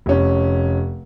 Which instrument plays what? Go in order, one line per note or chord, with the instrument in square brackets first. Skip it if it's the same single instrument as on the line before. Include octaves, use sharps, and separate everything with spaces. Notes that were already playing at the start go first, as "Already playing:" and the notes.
[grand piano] F1 C#4